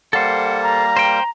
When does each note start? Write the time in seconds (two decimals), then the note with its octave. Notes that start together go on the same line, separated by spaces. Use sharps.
0.13 G3 A#3 A4 C5 F#5
0.63 A#5
0.97 C5 G5